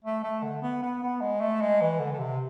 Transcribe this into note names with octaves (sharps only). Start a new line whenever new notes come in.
A3
A3
D3
B3
B3
B3
G#3
A3
G#3
E3
D3
D3
C3